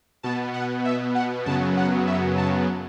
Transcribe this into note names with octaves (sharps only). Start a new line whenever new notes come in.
B2 B3 A5
F#5
E5
F#5
F#2 C#3 F#3 B3 A5
F#5
E5
A5